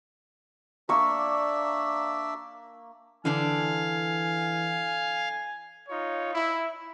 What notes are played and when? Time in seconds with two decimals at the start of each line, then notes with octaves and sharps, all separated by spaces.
0.89 A#3 D4 D5 E5 C#6
3.25 D3 E3 D4 F5 G#5
5.89 D#4 F4 C#5
6.34 E4